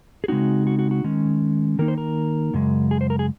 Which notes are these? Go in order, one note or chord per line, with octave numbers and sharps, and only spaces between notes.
G#4
C#3 G#3 C4 D#4 F#4
F#4
F#4
F#4
D#3 G#3 C#4
D#3 A#3 D#4 A#4
C5
A#4
F#2 C#3 G#3
G#4
C5
A#4
G#4